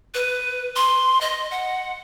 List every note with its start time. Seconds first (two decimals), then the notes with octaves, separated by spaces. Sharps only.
0.14 B4
0.76 C6
1.21 D#5
1.51 F#5